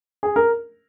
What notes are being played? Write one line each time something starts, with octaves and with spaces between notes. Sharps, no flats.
G#4
A#4